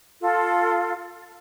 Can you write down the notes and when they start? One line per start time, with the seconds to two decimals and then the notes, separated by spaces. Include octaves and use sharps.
0.21 F4 A4